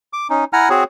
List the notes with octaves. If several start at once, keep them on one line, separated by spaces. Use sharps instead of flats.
D6
C#4 D#4
E4 F#5 G#5 A#5 F6
C4 F#4 G#4 C#5